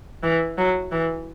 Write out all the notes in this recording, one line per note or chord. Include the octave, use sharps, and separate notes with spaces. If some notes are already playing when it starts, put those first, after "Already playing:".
E3
F#3
E3